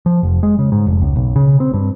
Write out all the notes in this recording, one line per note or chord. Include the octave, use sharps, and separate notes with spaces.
F3
F1
G#3
C#3
G#2
F1
C#2
B1
C#3
C4
G2